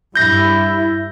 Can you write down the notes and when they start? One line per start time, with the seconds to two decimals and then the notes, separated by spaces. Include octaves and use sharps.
0.16 G2 E4 G6 A#6